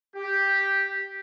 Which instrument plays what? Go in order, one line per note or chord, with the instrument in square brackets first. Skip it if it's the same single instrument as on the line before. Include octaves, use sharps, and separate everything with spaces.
[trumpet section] G4